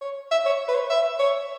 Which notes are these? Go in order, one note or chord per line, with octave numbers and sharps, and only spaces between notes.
C#5
E5
C#5
B4
C#5
E5
C#5